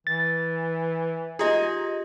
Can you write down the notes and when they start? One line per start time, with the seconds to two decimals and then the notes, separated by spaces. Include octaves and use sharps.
0.07 E3 A6
1.39 D#4 F4 G4 G#4 D#5